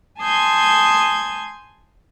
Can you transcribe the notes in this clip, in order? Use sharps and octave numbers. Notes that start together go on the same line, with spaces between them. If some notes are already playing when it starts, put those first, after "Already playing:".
G#5 A5 C6 D#6 G6 G#6